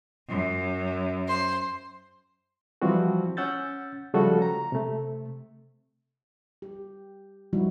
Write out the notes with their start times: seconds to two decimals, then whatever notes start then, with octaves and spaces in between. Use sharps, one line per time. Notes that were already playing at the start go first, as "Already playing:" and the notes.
0.29 F#2
1.28 C5 C6
2.82 E3 F3 G3 C4 F#4
3.37 C#4 F#5 E6 G6 A6
4.14 C#3 F3 G3 A3 F#4 A4
4.42 A#5
4.72 C3 A3
6.62 G4
7.53 E3 F3 G3 D#4 E4 F#4